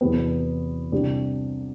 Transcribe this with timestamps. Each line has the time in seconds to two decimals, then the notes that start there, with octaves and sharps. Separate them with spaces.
0.01 E2 C3 F#3 B3
0.92 C2 C3 G3 D4 G4